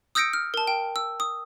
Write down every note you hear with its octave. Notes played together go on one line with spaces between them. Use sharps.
D#6 E6 G6 A#6 C#7 D7
F6
A#4 A5
G5
E6
D#6